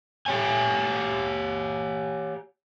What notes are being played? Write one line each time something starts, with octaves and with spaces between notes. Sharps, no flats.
G4 C#5 G#5